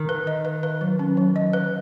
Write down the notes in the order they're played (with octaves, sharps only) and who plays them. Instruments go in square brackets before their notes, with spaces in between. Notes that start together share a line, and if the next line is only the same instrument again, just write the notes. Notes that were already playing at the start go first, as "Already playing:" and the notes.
Already playing: [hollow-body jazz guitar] D#3
[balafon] B4
D#5
B4
B4
F#3
C#4
F#3
D#5
B4